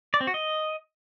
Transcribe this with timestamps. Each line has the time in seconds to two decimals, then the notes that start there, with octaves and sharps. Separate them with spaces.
0.14 D5
0.21 C4
0.27 F#4
0.34 D#5